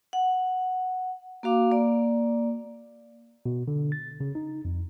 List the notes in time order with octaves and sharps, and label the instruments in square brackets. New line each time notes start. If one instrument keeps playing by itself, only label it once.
[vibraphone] F#5
A#3 F#4 F5 D6
A#3 D5
[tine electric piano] B2
D3
A6
C#3
D#4
F2